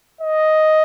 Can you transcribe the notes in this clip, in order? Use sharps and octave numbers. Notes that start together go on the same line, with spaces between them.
D#5